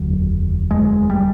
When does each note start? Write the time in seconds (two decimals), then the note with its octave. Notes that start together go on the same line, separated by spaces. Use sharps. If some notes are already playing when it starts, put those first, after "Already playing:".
Already playing: F1 D#2 D3 F#3
0.71 G#3
1.10 G3